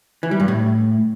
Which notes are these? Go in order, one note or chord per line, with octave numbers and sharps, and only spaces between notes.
E3
G3
G2
A2